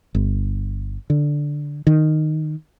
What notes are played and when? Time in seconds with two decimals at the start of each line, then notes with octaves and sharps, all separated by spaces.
0.15 G1
1.10 D3
1.87 D#3